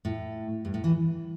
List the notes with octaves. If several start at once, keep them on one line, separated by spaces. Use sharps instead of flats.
A2
G2
A2
E3